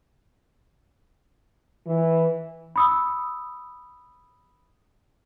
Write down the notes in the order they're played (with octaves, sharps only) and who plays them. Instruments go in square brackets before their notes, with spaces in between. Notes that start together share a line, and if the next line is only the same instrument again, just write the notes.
[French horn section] E3
[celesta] B5 D#6 E6